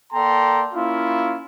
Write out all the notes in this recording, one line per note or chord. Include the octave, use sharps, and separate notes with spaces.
A#3 A4 D5 G5 A#5 C6
A#3 C#4 E4 F4